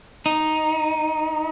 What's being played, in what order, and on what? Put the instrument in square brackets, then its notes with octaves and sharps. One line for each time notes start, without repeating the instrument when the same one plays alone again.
[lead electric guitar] D#4